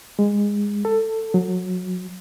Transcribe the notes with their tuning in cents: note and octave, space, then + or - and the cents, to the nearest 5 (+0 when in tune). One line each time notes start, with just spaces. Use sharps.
G#3 -20
A4 +15
F#3 -20